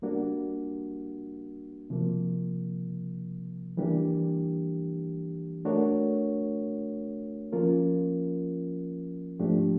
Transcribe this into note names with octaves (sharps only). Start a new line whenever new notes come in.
G3 A#3 D4 F#4
C3 F3 A#3
E3 G3 A#3 D4 G4
A3 D4 F#4 A#4 C#5
F3 A#3 C#4 F4 A#4
G#2 F3 A3 D4 G4